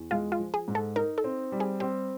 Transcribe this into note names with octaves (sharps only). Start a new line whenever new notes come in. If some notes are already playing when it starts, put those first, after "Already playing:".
Already playing: E2
G#3 F4
F4
F3
G#4
G#2
A4
D#4 A#4
A4
C4
G3
G#4
C4 G4